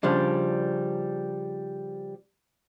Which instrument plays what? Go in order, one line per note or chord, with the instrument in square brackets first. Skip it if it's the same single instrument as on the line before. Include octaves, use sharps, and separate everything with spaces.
[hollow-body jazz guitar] C#3 F3 G3 D4